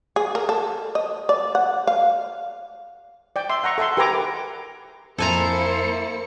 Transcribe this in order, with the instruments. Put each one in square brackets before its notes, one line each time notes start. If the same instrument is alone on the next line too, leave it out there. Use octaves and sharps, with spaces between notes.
[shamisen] G#4
A#4
A4
D#5
D5
F#5
F5
[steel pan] D5 G5
E5 C6
F#5 A#5 C#6
A4 E5 F#5 C6
G4 A#4 B4 G#5 A#5 D6
[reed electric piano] F2 [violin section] A#3 E4 C#7 [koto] A4 G#5 A#5 [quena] C5